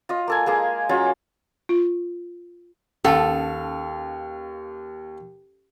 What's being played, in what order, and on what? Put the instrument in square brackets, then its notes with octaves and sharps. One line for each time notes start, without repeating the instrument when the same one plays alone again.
[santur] F4 D#5
A#3 A4 G#5
G#3 A#3 G#4 F5
F#3 C#4 F4 G#4
[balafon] F4
[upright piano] D#2 [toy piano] C#4 A5 [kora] A4 [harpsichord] F5